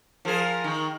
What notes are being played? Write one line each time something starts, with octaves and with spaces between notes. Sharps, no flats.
F3 G#4 A#4
D#3